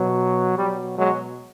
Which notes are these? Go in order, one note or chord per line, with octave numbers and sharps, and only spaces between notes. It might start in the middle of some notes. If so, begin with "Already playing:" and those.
Already playing: B2 F#3
B2 F#3 G3
F#3 G#3